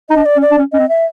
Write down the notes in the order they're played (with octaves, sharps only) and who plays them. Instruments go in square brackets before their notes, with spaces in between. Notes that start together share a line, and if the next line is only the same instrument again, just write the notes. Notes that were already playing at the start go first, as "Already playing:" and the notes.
[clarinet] D#4 [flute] D#5
[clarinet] D4
[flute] D5
[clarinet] C#4
[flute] D5
[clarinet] D4
C#4
[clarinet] C#4 [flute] D#5
[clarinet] C4
[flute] E5